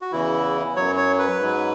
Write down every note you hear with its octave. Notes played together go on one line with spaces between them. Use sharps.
F#4
E2 C#3 E3 E4
F#2 F#3 C#5
C#5
B4
G#2 F#3